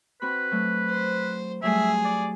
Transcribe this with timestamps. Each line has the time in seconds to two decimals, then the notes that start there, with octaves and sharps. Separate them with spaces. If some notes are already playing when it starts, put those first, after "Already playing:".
0.22 C4 F#4 B4 B5
0.51 F#3 A3
0.90 C5
1.63 F#3 G3 A3 G#4 E5
2.05 D5